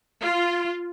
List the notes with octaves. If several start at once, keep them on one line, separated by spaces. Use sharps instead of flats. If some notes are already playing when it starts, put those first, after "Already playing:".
F4